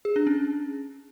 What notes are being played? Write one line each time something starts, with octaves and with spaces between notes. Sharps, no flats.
G#4
D4
C#4